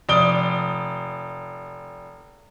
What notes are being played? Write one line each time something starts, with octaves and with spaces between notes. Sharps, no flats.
F1 D5 D#6 D7 G7